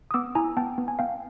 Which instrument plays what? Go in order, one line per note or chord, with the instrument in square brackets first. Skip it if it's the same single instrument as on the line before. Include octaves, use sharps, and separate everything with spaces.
[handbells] D#6
B3 D6 E6
E4 G#5 A#5
B3 G5 A5
B3
G#5
B3 F5 G5